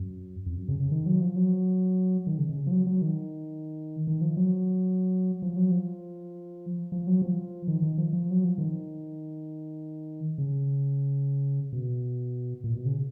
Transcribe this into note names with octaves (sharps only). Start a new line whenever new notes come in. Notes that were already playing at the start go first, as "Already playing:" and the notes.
Already playing: F#2
F2
F#2
C#3
C#3
D#3
F#3
F3
F#3
D#3
C#3
C#3
F3
F#3
F#3
D#3
D#3
F3
F#3
F3
F#3
F3
F3
F#3
F3
D#3
D#3
F3
F3
F#3
F3
D#3
C#3
B2
A#2
B2
C#3